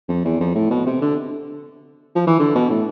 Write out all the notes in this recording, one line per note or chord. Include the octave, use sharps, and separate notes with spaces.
F2
E2
F2
A2
B2
C3
D3
F3
E3
D3
B2
A2